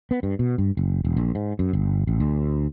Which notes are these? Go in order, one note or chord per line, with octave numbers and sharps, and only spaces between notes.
B3
G2
B2
G2
F#1
E1
A#1
G#2
F#2
G1
A1
D2